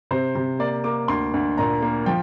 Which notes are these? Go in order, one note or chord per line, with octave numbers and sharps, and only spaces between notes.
C3 C5
C3
A#3 D5
A#3 D6
D2 C6
D2
A#2 A#5
A#3
F3 G5